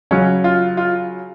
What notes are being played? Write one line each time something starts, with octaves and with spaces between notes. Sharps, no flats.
C#3 F#3 C#4
F4
F4